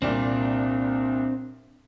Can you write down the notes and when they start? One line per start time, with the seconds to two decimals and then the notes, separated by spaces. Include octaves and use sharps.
0.02 C2 A#2 C4 D4